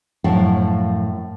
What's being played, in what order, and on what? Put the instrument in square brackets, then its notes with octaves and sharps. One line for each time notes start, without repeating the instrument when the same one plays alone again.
[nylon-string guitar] F#2 A2 F3 F5 F#5